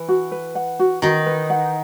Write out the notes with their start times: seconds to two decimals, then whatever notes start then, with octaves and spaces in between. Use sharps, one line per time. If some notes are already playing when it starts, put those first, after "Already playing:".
Already playing: E3
0.08 F#4
0.32 B4
0.55 F#5
0.79 F#4
1.02 D#3 D#4 F#4
1.26 B4
1.50 F#5